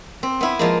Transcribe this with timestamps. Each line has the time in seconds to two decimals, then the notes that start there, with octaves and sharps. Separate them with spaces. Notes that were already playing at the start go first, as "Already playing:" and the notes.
0.23 C4
0.41 B3 E4
0.59 F3 G#3 A#3